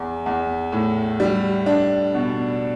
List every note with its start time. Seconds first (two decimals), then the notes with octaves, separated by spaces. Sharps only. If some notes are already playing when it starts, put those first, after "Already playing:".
Already playing: E2
0.26 E2
0.72 A2
1.20 G3
1.66 D4
2.14 B2